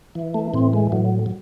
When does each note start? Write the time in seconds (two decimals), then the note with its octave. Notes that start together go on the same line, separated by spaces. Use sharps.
0.15 E3
0.34 A3
0.54 A2 C4
0.73 G#3
0.92 A2 F#3
1.26 F#3